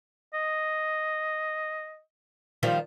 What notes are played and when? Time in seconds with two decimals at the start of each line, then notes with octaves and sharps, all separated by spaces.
0.34 D#5
2.63 D#3 F3 G3